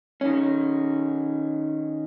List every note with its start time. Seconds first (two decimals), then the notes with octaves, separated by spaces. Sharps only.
0.21 D#3 C#4